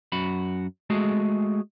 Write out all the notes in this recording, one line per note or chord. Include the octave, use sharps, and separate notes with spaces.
F#2 F#4 B5
G#3 A3 F#4 G#4